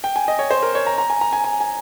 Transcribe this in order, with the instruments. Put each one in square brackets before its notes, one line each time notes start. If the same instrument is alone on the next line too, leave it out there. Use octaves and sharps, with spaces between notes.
[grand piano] G5
G#5
D#5
C#5
C5
A#4
C#5
A#5
A#5
G#5
A#5
G#5
G#5
G#5